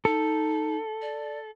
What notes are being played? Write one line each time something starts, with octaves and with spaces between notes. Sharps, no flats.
D#4 A4
D5